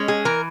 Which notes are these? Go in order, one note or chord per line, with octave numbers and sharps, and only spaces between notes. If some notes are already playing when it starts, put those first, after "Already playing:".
Already playing: G#3 C#4
G#4
E3 A#4